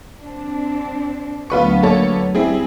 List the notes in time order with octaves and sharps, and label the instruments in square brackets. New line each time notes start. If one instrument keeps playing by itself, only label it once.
[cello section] C4 D4
[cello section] D2 F#3 B3 [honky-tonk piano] F4 B4 C#6
[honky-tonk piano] A#3 A4 C#5
[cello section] G3 [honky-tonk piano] C4 E4 G#4